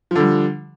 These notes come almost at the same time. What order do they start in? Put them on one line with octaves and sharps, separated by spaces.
F3 D3 G3